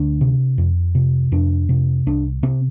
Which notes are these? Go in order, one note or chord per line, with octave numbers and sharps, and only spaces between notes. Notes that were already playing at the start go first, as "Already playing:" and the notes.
Already playing: D2 D4
C3
F2
C3
F2 D4
C3
C2 D4
C3 C4